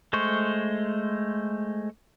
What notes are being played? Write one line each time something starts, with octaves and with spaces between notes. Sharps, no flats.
G#3 A3 C5 C#6